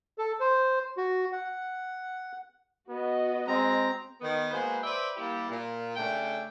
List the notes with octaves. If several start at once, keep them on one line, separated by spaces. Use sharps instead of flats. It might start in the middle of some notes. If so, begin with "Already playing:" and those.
A4
C5
F#4
F#5
B3 F#4 D#5
G#3 C4 A#5
D#3 B3
G#3 A#3 F#4 B4 C5
B4 C5 D5 E5 G5
G3 A#3 E4 G4
A#2
C#3 A3 D4 G5